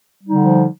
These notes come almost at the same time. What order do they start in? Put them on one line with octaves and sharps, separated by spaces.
G3 D#4 D3 F3